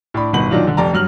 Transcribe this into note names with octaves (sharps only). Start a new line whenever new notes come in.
A2 D4 B5
G1 B2 D#3 F#5 B5 F#7
A#2 D#3 F#3 D4 F4
G1 D3
F1 G4 D5 A5 A#5
G2 F#3 F6 F#7